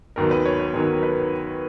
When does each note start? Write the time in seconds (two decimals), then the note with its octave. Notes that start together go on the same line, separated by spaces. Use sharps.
0.16 D#2 D#3 F#3 B3 A#4
0.31 B4
0.45 C#5
0.59 B4
0.73 D#2 D#3 F#3 B3 A#4
0.93 A#4
1.03 B4